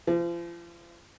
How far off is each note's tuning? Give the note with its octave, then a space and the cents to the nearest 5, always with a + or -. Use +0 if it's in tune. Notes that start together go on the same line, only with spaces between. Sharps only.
F3 -35